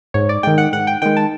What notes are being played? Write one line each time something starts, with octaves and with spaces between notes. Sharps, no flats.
G#2 C#5
D5
D#3 G#3 G5
F#5
G#2 F#5
G5
D#3 G#3 G5
A5